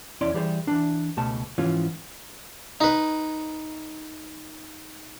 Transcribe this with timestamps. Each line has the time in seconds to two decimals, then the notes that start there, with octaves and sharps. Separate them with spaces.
0.21 E2 C#4 E4 D5 C6
0.34 E3 G3 G#4 C5
0.67 E3 F3 D4
1.17 C#2 B2 A3 A5
1.58 G#2 E3 F3 C#4 F4
2.81 D#4 B4